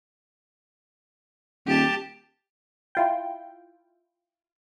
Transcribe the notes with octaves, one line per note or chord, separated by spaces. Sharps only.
D#1 G4 A5
E4 F4 G5